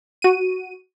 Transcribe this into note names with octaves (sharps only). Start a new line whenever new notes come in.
F#4 D#7